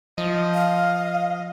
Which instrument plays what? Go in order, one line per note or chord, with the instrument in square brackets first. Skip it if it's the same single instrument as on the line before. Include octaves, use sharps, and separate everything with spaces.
[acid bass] F3 [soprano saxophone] D#5
[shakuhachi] F5